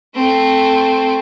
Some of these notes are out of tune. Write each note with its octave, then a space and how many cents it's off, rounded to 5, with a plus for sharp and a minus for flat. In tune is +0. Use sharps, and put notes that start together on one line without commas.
A3 +0 C4 +0